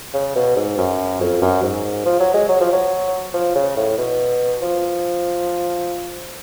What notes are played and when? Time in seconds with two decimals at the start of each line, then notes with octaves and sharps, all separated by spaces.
0.14 C#3
0.35 B2
0.56 G#2
0.78 F#2
1.20 F2
1.42 F#2
1.63 G#2
2.05 F3
2.20 F#3
2.34 G#3
2.48 F#3
2.60 F3
2.73 F#3
3.34 F3
3.55 C#3
3.77 A2
3.98 B2
4.62 F3